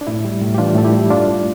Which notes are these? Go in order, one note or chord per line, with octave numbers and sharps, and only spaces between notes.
D4
A2 E4
G3
A2
G4
E3 D4 F4
A2 A4
E4 G4
G3
G2 D4 F4
A3